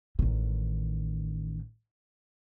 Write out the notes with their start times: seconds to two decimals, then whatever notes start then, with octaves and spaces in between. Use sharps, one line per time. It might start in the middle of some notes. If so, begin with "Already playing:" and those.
0.19 A1 D#3